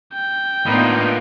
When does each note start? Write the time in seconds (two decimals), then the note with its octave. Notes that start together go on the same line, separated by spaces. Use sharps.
0.14 G5
0.66 A2 A#3 B3 D4 D#4 F4 B4